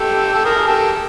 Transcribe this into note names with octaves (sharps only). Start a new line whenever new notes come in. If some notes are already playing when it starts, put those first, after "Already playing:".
Already playing: G4 A4
A4
G#4 A#4
G4 A4